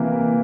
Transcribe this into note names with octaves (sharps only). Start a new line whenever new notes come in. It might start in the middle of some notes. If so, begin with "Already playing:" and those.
Already playing: C3 E3 A#3